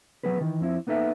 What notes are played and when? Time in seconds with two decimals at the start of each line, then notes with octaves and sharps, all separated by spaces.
0.24 F#3 B3 G#4 B4
0.41 D#3 E3
0.60 F2 C4 E4
0.87 A#3 B3 D#4 A4 E5